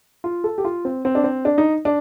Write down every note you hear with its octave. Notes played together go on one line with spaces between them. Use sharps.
F4
A4
G4
F4
C4
C4
D4
C4
D4
D#4
D4